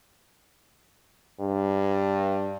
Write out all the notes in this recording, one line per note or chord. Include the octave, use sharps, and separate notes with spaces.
G2